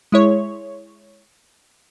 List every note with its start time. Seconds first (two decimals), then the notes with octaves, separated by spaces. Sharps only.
0.12 G#3 E4 C#5